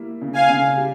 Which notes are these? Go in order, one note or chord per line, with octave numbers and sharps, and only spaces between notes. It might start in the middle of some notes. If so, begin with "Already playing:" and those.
Already playing: G3 A#3 E4
C#3
F5 G#5
C#3
G3